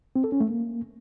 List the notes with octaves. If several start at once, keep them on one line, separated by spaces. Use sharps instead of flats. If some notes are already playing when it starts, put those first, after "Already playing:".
C4
A4
C#4
A3
A#3